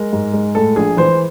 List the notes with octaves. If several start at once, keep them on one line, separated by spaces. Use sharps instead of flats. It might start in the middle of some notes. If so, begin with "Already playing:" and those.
Already playing: G#3 A#4
G#2
G#3
A2 A4
A#1 G#4
E3 C5